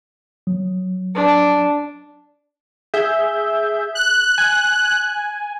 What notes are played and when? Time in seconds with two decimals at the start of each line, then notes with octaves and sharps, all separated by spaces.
0.47 F#3
1.15 D4
2.94 G#4 E5 G6
3.95 F#6
4.38 G#5